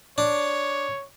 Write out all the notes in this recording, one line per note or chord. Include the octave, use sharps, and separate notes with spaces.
D4 C#5